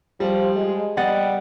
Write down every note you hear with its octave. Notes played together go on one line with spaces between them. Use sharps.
F3 G3
G#3
G3 B3 D#5 F#5 A6